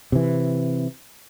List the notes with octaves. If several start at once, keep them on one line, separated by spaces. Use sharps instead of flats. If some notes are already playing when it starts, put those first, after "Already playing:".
C3 E3